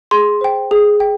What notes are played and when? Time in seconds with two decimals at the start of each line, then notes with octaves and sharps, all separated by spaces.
0.11 G#4 C6
0.41 C5 G5
0.71 G#4
1.00 G5